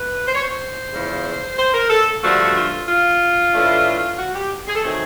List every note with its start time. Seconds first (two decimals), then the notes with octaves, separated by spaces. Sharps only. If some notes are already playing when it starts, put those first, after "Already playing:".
Already playing: B4
0.28 C5
0.35 C#5
0.43 C5
0.93 E2 C#3 F3
1.58 C5
1.74 A#4
1.90 A4
2.23 G2 D3 F3 A3 F#4
2.44 F#4
2.56 F4
2.88 F4
3.53 A2 E3 A3 D4
4.18 F#4
4.35 G4
4.67 G#4
4.75 A4
4.83 D#3 F#3 A3 C4 G#4